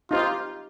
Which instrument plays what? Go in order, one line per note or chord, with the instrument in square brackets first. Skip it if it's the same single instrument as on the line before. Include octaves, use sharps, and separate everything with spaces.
[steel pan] D#4 G4 C5 [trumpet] F4